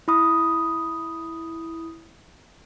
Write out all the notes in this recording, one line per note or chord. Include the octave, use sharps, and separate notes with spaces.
E4 B5 D#6